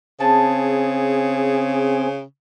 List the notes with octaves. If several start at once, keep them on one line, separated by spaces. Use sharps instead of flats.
C#3 C4 G#4 A5